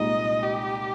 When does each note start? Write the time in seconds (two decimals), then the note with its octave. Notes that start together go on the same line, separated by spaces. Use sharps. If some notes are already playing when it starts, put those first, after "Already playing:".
Already playing: C2 A#2 G#3 D#4 D#5
0.43 G4